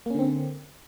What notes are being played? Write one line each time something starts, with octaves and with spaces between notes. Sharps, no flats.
D3 A#3 C4 C#4